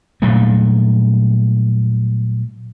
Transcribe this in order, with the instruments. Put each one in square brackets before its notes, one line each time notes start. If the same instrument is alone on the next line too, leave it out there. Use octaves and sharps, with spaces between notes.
[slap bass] A#2 F#3 G3 A3